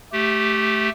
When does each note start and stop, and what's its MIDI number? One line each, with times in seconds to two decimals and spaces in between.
0.12 0.89 57
0.12 0.89 67